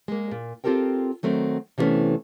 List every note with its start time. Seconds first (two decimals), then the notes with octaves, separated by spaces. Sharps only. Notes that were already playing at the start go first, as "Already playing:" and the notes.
0.08 G#3 A#3
0.31 A#2
0.64 C4 F4 G4 A4 A#4 G5
1.23 D#3 F#3 A3 C4
1.78 C3 E3 G3 A3 B3 C#4